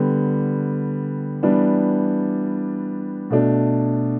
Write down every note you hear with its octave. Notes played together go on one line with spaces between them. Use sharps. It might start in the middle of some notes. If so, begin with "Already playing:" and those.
Already playing: D3 G3 B3
E3 G3 B3 D4
B2 A3 D4